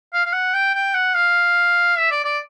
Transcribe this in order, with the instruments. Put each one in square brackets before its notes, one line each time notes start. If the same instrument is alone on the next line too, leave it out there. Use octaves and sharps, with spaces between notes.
[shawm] F5
F5
F#5
G5
G5
F#5
F5
E5
D5
D5